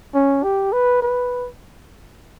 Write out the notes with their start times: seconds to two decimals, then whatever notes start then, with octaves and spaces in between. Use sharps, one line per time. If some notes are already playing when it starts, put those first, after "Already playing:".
0.15 C#4
0.43 G4
0.73 B4
1.02 B4